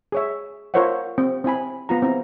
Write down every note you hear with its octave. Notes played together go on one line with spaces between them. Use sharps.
G#4 C#5 E5
F4 A#4 C5 C#5 E5 F#5
C4
C4 E4 G#5 B5
B3 F4 A#5
C4 E4 A#5